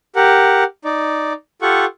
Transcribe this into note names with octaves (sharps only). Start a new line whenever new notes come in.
G4 A#4 F#5
D#4 D5
F4 G4 A4 F#5 C#6